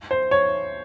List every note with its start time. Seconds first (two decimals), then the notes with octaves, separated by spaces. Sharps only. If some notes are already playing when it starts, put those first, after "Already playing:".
0.11 C5
0.31 C#5